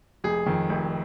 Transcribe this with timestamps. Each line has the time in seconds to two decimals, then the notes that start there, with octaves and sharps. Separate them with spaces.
0.24 F1 G#4
0.46 F2 D#3
0.69 F1